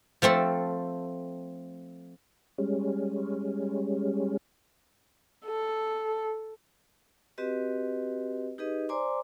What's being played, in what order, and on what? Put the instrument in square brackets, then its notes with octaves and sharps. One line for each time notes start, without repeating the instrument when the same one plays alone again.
[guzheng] F3 A3 C4 A4
[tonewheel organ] G3 G#3 C#4
[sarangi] A4
[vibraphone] C4 F#4 G4 B4 D#5
D#4 G4 G#4 B4 D#5
C5 D5 G#5 A#5 C6 D6